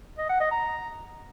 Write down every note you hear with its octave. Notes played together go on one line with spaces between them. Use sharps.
D#5
F#5
D#5
A#5